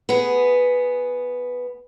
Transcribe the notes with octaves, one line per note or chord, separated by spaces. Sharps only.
B3 G#4